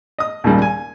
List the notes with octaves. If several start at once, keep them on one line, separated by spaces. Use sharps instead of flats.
D#5 D#6
D#2 A#2 C#3 G3 G#3
G#5